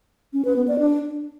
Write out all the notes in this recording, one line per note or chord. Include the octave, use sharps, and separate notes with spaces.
C#4
B4
B3
D5
D4